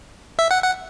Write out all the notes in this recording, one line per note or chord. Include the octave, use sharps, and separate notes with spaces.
E5
F#5
F#5